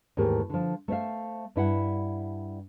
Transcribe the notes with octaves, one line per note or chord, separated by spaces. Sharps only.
D#2 G#2 E3 A3 G4 A#4
D3 F3
A3 C5 E5 F5
G2 E4 F#5